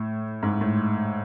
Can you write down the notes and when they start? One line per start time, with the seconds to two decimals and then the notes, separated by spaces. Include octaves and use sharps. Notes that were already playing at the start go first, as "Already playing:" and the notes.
Already playing: A2
0.43 G#2
0.61 A2